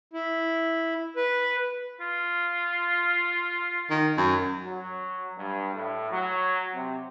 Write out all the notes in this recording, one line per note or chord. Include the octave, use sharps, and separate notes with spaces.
E4
B4
F4
D#3
F#2
F#3
G2
A2
F#3
C3